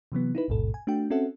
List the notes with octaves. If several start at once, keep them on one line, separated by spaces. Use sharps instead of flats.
C3 E3 F#3 B3
D#4 E4 B4
A1 D#2 G#2 B2 A4
G#5
A3 D4 F#4 G5
C4 C#4 F#4 A4 E5 F#5